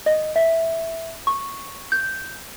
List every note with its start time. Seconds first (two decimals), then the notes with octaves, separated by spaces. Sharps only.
0.06 D#5
0.36 E5
1.27 C#6
1.92 G6